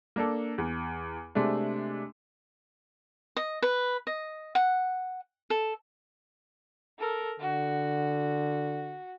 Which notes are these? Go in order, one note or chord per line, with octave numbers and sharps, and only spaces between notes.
A#3 D4 A4
E2
C3 G#3 A3 D4
D#5
B4
D#5
F#5
A4
A4 A#4
D3 F#4